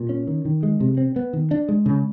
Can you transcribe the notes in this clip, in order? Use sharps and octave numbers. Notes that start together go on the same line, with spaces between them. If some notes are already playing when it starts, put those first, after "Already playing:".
Already playing: A#2
C#4
D#3
D#3
G#3
C3
C4
B3
D#3
D4
G#3
C#3